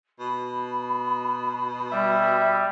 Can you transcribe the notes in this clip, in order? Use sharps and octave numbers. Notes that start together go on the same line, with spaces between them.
B2 B5
G3 E5